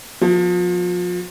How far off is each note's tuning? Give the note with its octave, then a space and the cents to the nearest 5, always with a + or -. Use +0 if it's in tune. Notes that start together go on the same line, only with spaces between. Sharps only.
F3 +35 B3 +0